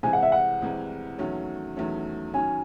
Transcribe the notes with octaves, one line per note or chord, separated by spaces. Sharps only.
C2 C3 E3 G#3 C4 G#5
F#5
E5
F#5
C2 C3 E3 G#3 C4
E2 D#3 F#3 A3 C#4
E2 D#3 F#3 A3 C#4
D#3 F#3 C#4 G#5